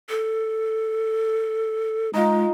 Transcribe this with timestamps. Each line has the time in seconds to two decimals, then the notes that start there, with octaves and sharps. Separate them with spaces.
0.09 A4
2.14 G#3 D#4 F4